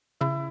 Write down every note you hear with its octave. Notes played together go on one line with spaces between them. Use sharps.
C#3 E4